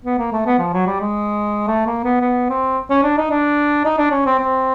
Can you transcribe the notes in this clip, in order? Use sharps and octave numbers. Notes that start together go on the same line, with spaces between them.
B3
A#3
A3
B3
F3
F#3
G3
G#3
A3
A#3
B3
B3
C4
C#4
D4
D#4
D4
D#4
D4
C#4
C4
C4